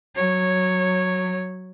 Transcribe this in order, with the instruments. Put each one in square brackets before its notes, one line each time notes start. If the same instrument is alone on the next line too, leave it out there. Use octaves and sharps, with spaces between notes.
[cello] F#3 C#5